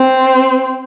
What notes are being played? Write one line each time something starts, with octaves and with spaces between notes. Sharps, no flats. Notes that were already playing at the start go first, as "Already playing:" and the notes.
Already playing: C4